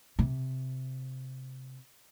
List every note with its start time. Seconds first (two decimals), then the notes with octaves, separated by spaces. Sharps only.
0.19 C3